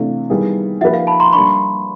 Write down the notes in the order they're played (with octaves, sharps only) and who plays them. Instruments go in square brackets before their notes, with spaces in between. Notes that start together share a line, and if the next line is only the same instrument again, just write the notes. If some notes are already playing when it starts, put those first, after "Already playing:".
Already playing: [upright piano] C3 E3 A3 D4 [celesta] F5
[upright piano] D#3 G3 B3 E4 G#4
[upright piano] F3 A#3 D#4 G4 B4 [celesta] E5 F#5
[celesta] F5
A5 B5
A#5 C6
[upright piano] G3 A#3 D4 [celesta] B5 C#6